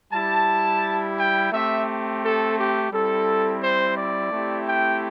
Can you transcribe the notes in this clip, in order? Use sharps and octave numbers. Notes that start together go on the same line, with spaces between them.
G3 E4 G4 A5
G5
A3 C4 G4 E5
A4
G4
G3 C4 E4 A4
C5
D5
A3 C4 E4 G4
G5